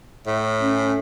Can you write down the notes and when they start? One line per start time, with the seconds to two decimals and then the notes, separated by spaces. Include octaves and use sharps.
0.26 A2
0.60 C#4